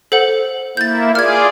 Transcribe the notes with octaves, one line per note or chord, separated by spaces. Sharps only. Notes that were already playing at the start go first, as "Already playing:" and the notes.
A4 C5 F#5
A#3 E4 G6 A6
F4 G#4 D5 F6 G#6